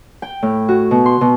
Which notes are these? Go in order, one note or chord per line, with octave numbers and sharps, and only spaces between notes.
G5
A2
F#4
B2
C6
B2